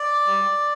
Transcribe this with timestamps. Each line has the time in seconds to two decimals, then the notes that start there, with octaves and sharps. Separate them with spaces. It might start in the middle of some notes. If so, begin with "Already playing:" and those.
Already playing: D5
0.27 G3